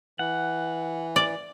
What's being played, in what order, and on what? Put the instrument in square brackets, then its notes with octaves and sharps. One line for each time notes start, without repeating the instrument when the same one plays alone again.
[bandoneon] E3 [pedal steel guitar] F#5
[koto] D5